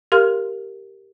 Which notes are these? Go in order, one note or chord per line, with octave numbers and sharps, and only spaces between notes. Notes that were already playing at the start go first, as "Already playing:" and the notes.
G4 A#4 F5 C6 F6